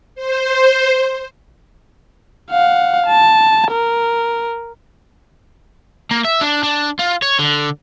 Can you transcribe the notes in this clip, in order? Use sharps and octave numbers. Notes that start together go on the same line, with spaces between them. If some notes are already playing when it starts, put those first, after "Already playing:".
C5
F5 F#5
A5
A#4
A#3
E5
D4
D4
F4
C#5
D3